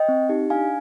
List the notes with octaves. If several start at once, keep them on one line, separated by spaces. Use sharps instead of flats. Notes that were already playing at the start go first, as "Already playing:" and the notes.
Already playing: D#5 G5
C4
D#4 G4
D4 F5 G#5